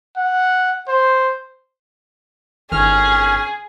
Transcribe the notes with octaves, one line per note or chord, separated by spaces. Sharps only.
F#5
C5
G1 D#3 C#4 G#4 F6